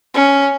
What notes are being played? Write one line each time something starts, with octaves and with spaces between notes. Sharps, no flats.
C#4